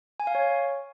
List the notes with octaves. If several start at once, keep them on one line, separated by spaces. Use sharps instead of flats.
G#5
F5
C#5